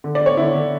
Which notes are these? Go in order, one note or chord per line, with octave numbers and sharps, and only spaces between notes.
D3
D5
D3 C#5
D3 E4
D3